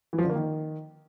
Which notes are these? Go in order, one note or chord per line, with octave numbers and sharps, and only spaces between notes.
E3
F3
D3
A#3
D#3